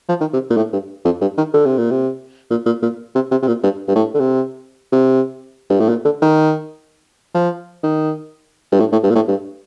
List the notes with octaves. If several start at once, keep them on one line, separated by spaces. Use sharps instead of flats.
F3
D#3
C3
A#2
A2
G2
F2
G2
D#3
D3
C3
A#2
C3
A#2
A#2
A#2
C3
C3
C3
A#2
G2
G2
A2
D3
C3
C3
G2
A2
A#2
D3
D#3
F3
D#3
G2
A2
A2
G2
A#2
A2
G2